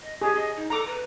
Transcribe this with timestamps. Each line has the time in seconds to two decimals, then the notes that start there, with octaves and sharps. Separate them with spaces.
0.01 D#5
0.22 G4 G#4
0.35 D#5
0.56 D#4
0.70 A4 A#5 D6
0.86 B4